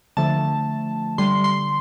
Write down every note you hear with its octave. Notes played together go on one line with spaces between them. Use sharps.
D3 F3 A3 A5
D3 G3 C6
C6